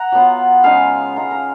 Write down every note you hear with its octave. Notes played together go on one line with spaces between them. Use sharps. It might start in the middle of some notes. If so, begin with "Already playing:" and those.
Already playing: F#5 A#5
F#3 B3 F4
C#3 G#3 D#4 F5 G#5
C#3 G#3 D#4 A#5
A#5